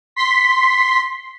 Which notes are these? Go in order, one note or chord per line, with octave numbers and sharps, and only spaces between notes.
C6 B6